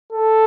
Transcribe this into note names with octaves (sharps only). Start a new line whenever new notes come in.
A4